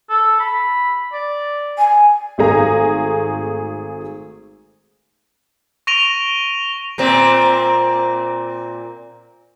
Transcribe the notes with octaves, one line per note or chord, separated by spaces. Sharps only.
A4
B5
D5
G#5
G#1 A3 G#4 A#5
C#6 A#6 D7 D#7 F7 G7
A#2 A#3 C4